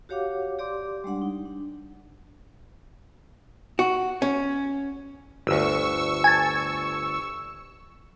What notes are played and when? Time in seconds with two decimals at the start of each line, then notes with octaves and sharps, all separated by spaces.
0.09 F#4 G4 C#5 F5 F#5 D6
0.59 G4 D5 C6 D6
1.04 G3 G#3 D4 F#5
1.22 D#4
1.46 D4
3.79 F#4
4.22 C#4
5.47 G1 D2 C#6 E6
6.24 G#5 A5